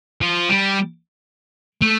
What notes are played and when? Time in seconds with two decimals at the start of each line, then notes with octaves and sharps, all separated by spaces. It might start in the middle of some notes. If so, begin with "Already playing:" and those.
0.22 F3
0.49 G3
1.82 A3